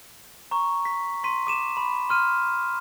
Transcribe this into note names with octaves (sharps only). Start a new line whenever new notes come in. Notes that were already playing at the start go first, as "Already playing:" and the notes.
A#5 C#6
B6
C6 B6 D#7
D6 D#7 E7
B5
C6 F6 D#7